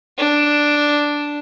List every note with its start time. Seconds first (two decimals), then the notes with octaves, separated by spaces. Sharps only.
0.18 D4